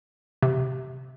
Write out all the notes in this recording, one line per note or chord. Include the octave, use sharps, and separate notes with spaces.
C3